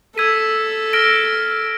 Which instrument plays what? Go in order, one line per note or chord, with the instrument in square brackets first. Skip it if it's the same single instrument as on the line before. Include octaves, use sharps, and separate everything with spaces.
[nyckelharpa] A4 [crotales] E6 G#6 B6 D#7
[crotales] F6 A#6 D7 G7